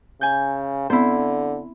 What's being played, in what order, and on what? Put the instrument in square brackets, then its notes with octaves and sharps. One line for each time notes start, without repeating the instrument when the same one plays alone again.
[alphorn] C#3 [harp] G#5 G6
[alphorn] D3 [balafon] B3 C4 [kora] E4 C5